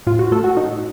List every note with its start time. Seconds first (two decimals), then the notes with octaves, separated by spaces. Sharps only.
0.07 A2 F4
0.19 F#4
0.32 A3 A4
0.44 F#4
0.57 A2 D#4